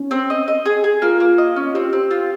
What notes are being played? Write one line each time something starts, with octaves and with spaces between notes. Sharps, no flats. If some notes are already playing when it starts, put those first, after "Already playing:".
Already playing: C#4
C4
D#5
D#5
G#4
G#4
A#3 F4
A#3
D#5
C#4
C4 G4
C4
F4